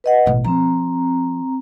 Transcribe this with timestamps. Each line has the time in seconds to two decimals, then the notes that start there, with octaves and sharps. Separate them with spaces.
0.04 B4 D#5 F#5
0.26 A1 B2
0.44 F3 C4 A#5